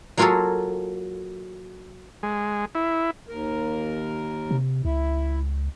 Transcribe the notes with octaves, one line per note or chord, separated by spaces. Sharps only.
F#3 A#3 F4 F#4 G#4 A4
G#3
E4
D#2 A#4
C3
C#2 E4